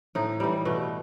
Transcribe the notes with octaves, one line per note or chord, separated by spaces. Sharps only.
A2 D#4
E3 G3 D#4
B2 A3